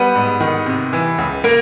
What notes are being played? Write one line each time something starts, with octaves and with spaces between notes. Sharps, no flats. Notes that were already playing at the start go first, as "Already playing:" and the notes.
Already playing: G3 B3 B4
G#2
D#3
C3
E3
C#2
A#3 A#4